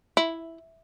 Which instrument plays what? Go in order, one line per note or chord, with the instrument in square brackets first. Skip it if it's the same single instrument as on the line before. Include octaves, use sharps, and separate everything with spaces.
[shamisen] E4